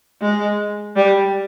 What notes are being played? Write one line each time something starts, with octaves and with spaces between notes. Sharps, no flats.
G#3
G3